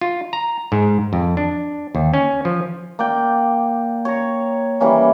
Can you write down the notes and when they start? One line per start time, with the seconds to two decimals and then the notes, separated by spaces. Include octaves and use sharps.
0.01 F4
0.33 A#5
0.72 G#2
1.13 F2
1.37 D4
1.95 D#2
2.14 C#4
2.45 F3
2.99 A#3 D5 G5
4.05 C#5 A#5
4.80 E3 G3 A#3 C#4